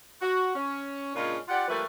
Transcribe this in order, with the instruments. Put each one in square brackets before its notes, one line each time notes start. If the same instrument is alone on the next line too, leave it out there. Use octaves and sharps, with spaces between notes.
[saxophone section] F#4
C#4
A#2 C#3 G#3 C#4 D4 F4
F4 G4 D5 F#5
F3 G3 A3 A#3 B4